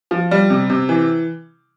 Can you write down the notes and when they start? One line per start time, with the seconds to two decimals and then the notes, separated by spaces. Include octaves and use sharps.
0.11 F3
0.31 G3
0.50 C3
0.70 C3
0.89 E3